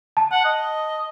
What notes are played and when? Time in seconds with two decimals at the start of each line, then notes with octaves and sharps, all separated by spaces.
0.17 A5
0.32 F#5
0.45 D#5